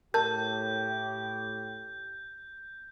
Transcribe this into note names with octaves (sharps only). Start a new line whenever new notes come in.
A2 G4 A#4 A5 G6